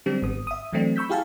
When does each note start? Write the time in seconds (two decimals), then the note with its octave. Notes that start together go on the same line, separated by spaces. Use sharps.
0.06 D3 F#3 G3 C4 D4
0.22 G#1 B3 D#6
0.47 E5 D#6
0.72 E3 F#3 A3 C4 D4
0.96 B5 C#6 E6 G6 B6
1.09 E4 G4 G#4 F5 G#5 A5